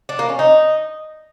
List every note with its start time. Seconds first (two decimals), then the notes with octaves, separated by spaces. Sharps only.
0.09 D4
0.19 A#3
0.29 C#4
0.39 D#4